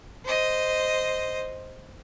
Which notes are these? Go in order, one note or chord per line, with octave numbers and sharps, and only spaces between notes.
C5 D#5